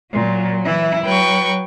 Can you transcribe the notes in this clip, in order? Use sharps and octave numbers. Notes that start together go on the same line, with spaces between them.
A#2 F#3
E3 E4
F#3 B4 G5 C#6